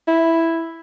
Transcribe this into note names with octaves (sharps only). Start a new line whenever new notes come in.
E4